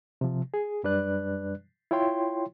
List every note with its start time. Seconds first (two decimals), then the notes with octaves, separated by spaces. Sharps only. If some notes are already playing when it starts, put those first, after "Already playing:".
0.21 C3 F3
0.54 G#4
0.83 F#2 G3 D4 B4 D5 F#6
1.91 E4 F4 C#5 G5 C6